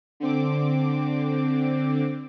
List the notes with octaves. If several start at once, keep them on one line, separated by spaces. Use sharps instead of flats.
D3 C4 D6